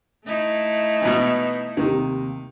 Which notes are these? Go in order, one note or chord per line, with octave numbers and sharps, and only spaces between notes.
A3 D#4 E4
B2 E3
D#2 C3 D#3